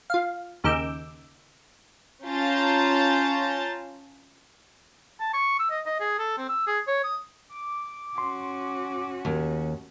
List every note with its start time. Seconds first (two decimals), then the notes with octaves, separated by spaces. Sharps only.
0.10 F4 F5
0.64 D#2 C#3 D#4 D6 E6 G6
2.25 C#4 F4 A5 A#5 G6 A6
5.20 A5
5.33 C#6
5.59 E6
5.71 D#5
5.86 D#5
6.00 G#4
6.19 A4
6.38 C4
6.49 E6
6.67 G#4
6.87 C#5
7.04 D#6
7.49 D6
8.18 C#4 F#4 C6
9.25 D#2